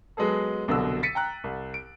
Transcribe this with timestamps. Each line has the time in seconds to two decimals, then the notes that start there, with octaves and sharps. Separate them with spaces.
0.17 F#3 G#3 B3 G#4 A4
0.68 C2 B2 D3 F#3 E6
1.03 A6 B6 C#7 D#7
1.15 G5 A#5 F#6
1.44 C2
1.74 D7